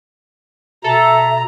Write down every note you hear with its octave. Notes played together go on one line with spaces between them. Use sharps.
B2 A4 E5 A#5